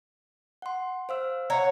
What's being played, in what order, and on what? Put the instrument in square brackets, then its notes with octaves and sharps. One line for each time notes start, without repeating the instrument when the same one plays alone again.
[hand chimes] F#5 C6
C5 F5 E6
[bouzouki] C#5 F#5 A#5